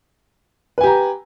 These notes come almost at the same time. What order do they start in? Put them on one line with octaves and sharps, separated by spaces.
B4 G#5 G4 A#5